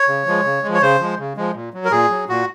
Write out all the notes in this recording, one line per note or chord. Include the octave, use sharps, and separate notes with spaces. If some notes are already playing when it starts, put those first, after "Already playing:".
Already playing: C#5
C#3
F3 G#3
C#3
G#3
F3
C#5
C#3 C5
F3 G#3
C#3
F3 G#3
A#2
F#3
A#4
A#2 G#4
F#3
A#2 F#4